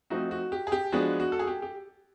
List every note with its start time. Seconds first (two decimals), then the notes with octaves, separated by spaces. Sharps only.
0.10 F3 A3 C4 D#4 F#4
0.31 F#4
0.52 G4
0.67 G#4
0.72 G4
0.92 F3 G#3 B3 D4 F#4
1.20 F#4
1.32 A4
1.39 G#4
1.47 G4
1.62 G4